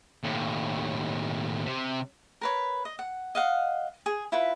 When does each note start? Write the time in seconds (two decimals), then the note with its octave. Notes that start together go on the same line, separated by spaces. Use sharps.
0.24 D#2 A2
1.66 C3
2.41 A#4 B4 C#5
2.85 D#5
2.99 F#5
3.35 D#5 F5 F#5
4.06 G#4
4.32 E4 F4 B4